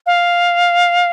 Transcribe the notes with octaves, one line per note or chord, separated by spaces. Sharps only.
F5